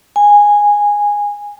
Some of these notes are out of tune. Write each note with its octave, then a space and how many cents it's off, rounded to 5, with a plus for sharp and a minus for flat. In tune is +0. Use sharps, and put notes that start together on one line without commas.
G#5 -10